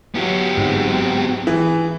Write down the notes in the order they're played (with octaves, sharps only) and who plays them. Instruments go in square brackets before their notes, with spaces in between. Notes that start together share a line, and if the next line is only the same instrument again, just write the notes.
[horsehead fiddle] F#3 [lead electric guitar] B3 G4
[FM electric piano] G1 G#2 F#3 [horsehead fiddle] C4 F#4
[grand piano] E3 [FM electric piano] G#4